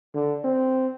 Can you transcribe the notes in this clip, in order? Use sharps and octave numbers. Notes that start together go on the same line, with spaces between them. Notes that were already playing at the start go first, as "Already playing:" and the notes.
D3
C4